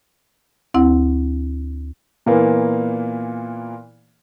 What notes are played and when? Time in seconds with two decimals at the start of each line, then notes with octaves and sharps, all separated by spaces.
0.74 D2 C4 E4 F#5
2.26 A#2 E3 A#3 B3